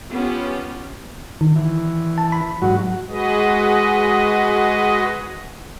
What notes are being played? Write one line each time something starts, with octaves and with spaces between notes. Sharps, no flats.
B3 C#4 F4 G4
D#3
E3
A5
B5
G#2 F#3 F#4
G#3 F#4 G#4 B4 D#5